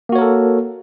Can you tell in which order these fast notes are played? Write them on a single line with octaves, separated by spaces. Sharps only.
A#3 F#4 C#5 A#4 A4